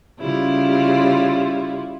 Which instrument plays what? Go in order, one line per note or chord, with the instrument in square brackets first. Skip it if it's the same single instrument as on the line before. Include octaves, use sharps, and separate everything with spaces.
[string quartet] C#3 G3 E4 F4